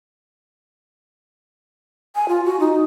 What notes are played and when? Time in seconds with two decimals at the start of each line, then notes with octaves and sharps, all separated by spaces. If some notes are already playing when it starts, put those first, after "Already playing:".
2.15 G#5
2.29 F4
2.45 F#4
2.60 D#4